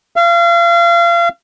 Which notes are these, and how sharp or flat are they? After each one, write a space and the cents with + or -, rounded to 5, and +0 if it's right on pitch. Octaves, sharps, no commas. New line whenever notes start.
F5 -35